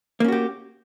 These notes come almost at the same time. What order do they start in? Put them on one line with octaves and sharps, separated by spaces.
A#3 C#4 F#4 G4